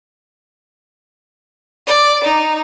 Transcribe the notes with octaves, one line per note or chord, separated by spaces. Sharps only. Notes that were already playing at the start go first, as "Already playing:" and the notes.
D5
D#4